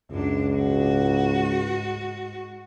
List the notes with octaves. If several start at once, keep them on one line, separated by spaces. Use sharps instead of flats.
C#2 F#2 D4
G#2 F#4